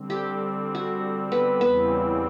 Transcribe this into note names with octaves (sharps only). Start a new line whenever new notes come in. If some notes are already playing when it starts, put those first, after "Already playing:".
Already playing: D3 G3 C4
G4
F#4
B3
E2 C#3 E3 G3 B3 C4